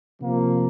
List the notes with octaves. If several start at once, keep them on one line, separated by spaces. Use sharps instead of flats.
C3 F3 A#3